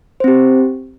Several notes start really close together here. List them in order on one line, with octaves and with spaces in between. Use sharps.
C5 C4 G4